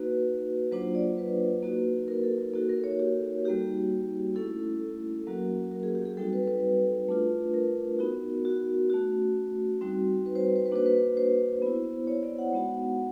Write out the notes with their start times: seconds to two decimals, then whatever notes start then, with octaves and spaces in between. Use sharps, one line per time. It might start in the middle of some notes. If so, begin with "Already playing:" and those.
Already playing: A#3 D#4 F#4 B4
0.72 F#3 A#3 D4 F4 C5
0.95 D5
1.18 B4
1.63 A#3 D#4 F#4
2.08 A#4
2.23 A4
2.38 A#4
2.54 A#3 D#4 F#4 A4
2.69 A#4
2.84 C#5
3.00 G4
3.45 G3 A#3 D#4 F#4 G4
4.35 A3 C#4 E4 A4
5.27 F#3 A#3 C#4 F#4 A#4
5.71 A#4
5.83 G#4
5.95 G4
6.06 G#4
6.17 G3 C4 D#4 F#4 A4
6.33 B4
6.48 B4
7.08 A3 D4 F4
7.54 A#4
7.99 B3 D#4 F#4
8.45 F#4
8.90 A3 C#4 F#4
9.81 G3 C4 D#4 F#4
10.26 B4
10.35 C5
10.46 B4
10.56 C5
10.66 B4
10.72 A#3 D4 F#4 C5
10.86 B4
11.17 C5
11.62 B3 E4
12.07 C#5
12.23 D5
12.39 F#5
12.53 G#3 B3 D#4 F#4